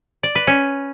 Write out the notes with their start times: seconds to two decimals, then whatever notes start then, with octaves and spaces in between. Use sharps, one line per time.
0.23 D5
0.35 B4
0.47 C#4